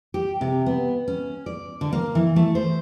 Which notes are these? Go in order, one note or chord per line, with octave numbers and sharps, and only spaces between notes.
G4
C3
B3
C#4
D5
D3
A#3
E3
A3
C5